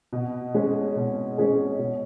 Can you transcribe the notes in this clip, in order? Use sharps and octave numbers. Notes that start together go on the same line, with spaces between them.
B2
G#3 C#4 G#4
B2
G#3 C#4 G#4
B2